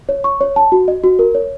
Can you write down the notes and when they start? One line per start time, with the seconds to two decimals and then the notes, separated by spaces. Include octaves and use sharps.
0.09 C#5
0.24 C#6
0.41 C#5
0.56 A5
0.72 F#4
0.88 D#5
1.04 F#4
1.19 A#4
1.35 C#5